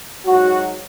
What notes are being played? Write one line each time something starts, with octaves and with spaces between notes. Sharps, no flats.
G#2 F#3 F#4